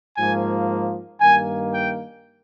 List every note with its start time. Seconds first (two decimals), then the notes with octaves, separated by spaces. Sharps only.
0.17 G#2 F3 A#3 G#5
1.20 G2 D#3 A#3 G#5
1.73 G5